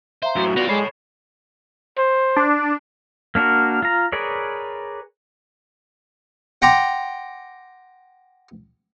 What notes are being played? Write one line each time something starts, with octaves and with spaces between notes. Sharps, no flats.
C5 E5 F5 A#5
F#2 A2 F#4
G3 B3 F4 D5 A#6 F7 F#7
G#3 A4 C#5 B5 C7
C5
D4
A#3 D4 F#4 A#4
F4 A#5
G#4 A#4 B4 C#5 D5
F#5 G5 A#5 C6 D6